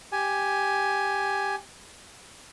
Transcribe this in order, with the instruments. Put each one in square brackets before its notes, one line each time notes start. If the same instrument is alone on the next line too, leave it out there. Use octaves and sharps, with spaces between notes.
[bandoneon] G4 G#5